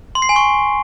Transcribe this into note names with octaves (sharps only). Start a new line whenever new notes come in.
C6
C7
G#5
C#6